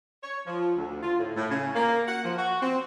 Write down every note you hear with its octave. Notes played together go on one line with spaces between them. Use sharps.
C#5
F3
D2
F4
A2
A2
C#3
A#3
F#5
F3
F#4
C4